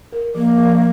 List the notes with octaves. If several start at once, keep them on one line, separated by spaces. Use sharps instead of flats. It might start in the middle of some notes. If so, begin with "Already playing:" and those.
A#4
F3 A#3
F3